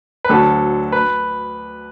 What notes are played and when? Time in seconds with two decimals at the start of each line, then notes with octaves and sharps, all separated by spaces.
0.25 B4
0.29 D2 D3 F#3 A4
0.92 B4